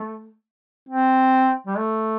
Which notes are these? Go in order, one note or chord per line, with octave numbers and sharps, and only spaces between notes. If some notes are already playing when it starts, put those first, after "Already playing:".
Already playing: A3
C4
G3
A3